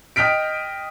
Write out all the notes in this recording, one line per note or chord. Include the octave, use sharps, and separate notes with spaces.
D#5 G5 F6 B6 D7